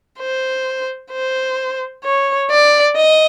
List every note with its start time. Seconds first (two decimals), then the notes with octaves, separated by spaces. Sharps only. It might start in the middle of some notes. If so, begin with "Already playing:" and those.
0.20 C5
1.13 C5
2.04 C#5
2.50 D5
2.96 D#5